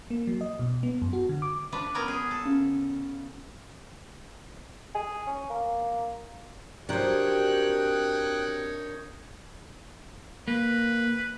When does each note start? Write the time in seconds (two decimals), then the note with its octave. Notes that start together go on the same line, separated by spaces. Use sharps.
0.11 A#3
0.27 F#3
0.41 D#5
0.59 B2
0.83 B3
1.02 F#2
1.13 F#4
1.29 D3
1.42 D6
1.72 F3 D4 B4
1.95 B3 C#4 A#4
2.08 G#4
2.31 A4
2.45 C#3
4.95 G#4
5.27 C#4
5.50 A#3
6.89 C3 F#3 D4 D#4 A#4 C#5 G5 F#6
10.48 A#3 B4